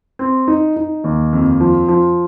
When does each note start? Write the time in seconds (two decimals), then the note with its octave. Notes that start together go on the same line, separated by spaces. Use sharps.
0.19 C4
0.48 D#4
0.76 D#4
1.04 D#2
1.33 F2
1.60 F3
1.88 F3